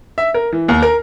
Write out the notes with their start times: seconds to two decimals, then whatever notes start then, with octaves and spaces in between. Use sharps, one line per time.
0.18 E5
0.34 A#4
0.52 E3
0.68 D#2
0.82 A#4